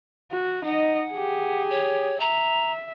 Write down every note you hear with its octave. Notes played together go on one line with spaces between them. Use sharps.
F#4
D#4 D#5 F#5
G4 G#4
C#5
E5 A#5